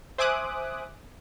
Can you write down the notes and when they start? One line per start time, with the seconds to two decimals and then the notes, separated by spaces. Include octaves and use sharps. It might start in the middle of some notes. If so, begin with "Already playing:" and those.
0.18 C5 E5 G#5 D6 D#6 F#6